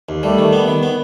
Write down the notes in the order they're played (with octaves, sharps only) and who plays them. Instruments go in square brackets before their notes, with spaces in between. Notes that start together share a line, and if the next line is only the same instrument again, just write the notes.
[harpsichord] D#2
[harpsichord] G3 [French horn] A3
[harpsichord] D#3
B3
D#3
B3